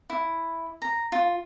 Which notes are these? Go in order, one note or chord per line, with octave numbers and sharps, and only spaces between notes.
E4
A#5
F4